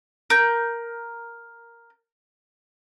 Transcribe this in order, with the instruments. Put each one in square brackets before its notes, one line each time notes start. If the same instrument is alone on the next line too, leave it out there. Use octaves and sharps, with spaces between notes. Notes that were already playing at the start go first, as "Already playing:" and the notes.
[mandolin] A#4 G6